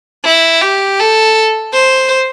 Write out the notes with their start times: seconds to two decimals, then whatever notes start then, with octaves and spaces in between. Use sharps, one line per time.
0.24 E4
0.62 G4
1.00 A4
1.73 C5